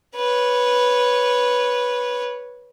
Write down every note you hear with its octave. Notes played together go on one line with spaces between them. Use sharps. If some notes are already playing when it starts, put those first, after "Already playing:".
B4 C#5